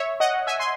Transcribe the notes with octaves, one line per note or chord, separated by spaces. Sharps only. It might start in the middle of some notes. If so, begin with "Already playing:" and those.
Already playing: C#5 E5
D#5 F#5
E5 G#5
G#5 C6